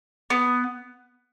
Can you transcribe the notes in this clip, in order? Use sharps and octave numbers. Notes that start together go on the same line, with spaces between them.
B3